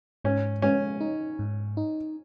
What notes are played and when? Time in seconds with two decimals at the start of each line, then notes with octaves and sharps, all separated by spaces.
0.24 G#2 C#4
0.62 G#3 C#4
1.00 D#4
1.39 G#2
1.77 D#4